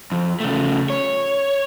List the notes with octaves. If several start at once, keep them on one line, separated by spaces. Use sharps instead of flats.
F2
C#3 A3
C#5